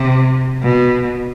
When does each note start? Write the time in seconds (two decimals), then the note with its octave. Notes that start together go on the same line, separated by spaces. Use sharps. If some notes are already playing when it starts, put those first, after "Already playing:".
Already playing: C3
0.62 B2